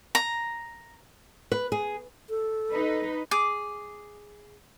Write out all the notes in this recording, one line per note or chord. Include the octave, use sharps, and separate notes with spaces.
A#5
B4
G#4
A4
D#4 B4
G#4 D6